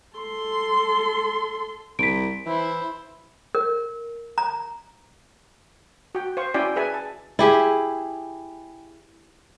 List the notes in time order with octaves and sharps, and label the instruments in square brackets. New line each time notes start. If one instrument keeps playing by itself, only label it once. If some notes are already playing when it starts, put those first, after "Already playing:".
[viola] A4 C6
[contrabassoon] C2 [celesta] B6 D7
[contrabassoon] E3 [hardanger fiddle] E4 C5
[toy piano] A#4
A#5
[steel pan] F#4 G5
C5 F5 C#6
C#4 E4 F#4 D5 G5 G#5
G#4 B4 E5 G#5 A5
A5
[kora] E4 G4 G#4